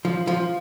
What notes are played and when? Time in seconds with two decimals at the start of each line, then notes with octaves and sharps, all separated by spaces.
0.05 F3
0.27 F3